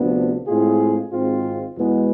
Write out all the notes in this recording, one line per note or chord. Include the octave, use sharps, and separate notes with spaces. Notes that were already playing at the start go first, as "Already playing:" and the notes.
Already playing: D2 C3 F3 B3 D4
A2 G#3 C4 F4 G#4
G#1 G#2 G#3 C4 F4
E2 B2 G#3 B3